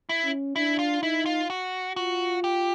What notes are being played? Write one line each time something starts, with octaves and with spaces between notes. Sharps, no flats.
E4
C#4
D4 E4
F4
D#4 E4
F4
F#4
F4 F#4
G4